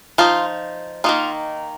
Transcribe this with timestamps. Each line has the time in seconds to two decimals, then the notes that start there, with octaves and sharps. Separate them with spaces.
0.18 F3 D#4 F4
1.04 D#3 A#3 D#4 F4